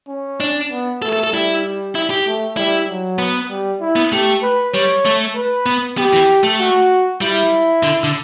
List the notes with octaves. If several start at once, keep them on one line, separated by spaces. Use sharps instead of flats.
C#4
D4
B3
A3 A4
A4
A4
G3 E4
E4
G4
A3
G3 E4
F#3
B3
G3
E4
B3
A3 G4
B4
G3 C#5
A3
B4
B3
B3 G4
E3
A3
F#4
G3 E4
D3
D3